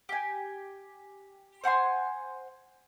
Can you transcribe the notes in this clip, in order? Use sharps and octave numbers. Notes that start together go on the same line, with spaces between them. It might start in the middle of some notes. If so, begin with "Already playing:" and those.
G4 G#5
C5 F#5 G#5 C6